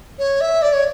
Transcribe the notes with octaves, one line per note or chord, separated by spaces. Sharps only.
C#5
E5
D5
C#5